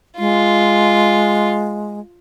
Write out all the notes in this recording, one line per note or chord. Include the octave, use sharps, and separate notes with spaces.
G#3 F4